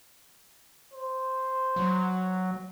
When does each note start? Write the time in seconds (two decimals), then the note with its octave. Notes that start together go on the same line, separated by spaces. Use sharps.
0.94 C5
1.76 F#3